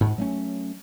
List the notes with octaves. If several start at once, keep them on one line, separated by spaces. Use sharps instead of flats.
G#2
F#3 A3 C#4